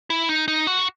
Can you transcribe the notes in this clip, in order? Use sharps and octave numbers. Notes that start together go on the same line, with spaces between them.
E4
D#4
D#4
F#4